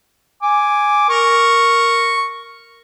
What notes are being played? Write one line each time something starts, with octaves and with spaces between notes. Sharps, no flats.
G#5 D6
A#4 C#6